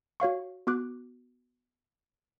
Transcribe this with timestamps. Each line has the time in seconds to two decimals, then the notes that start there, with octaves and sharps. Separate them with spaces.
0.20 F#4 C#5 F5 C#6
0.67 B3 F#4 D6 F#6